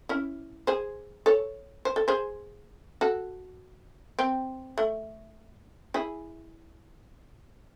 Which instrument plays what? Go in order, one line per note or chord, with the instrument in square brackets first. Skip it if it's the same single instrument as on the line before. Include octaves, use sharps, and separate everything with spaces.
[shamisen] C#4 E4
G#4 C5
A4 C#5
C5
A4
G#4 C5
F#4 A4
C4
A3
E4 G#4